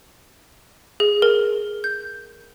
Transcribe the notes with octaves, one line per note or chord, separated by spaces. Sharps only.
G#4
A#4
G6